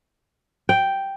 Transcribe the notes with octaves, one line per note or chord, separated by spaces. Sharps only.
G5